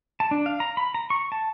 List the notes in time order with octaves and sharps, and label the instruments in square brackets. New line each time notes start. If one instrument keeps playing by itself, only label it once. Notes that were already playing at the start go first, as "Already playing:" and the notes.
[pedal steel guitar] A5
D4
F5
A#5
B5
A#5
C#6
A5